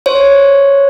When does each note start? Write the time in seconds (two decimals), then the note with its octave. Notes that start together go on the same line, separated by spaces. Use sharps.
0.06 C5 C#5